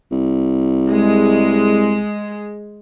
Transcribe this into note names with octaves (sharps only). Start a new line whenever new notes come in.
C2
G#3